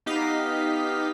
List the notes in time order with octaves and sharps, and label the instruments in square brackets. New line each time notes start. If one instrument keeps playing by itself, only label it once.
[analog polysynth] B3 D#4 G4 D#5 F5 B6